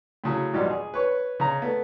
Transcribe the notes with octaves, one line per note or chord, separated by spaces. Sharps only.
A2 C#3 F#3
E2 G#2 B2 F3 G3
G#4
B4 C#5 C#6
C#3 A#5
A3 B3